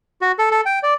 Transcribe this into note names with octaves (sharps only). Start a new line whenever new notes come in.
F#4
A4
A4
G5
D5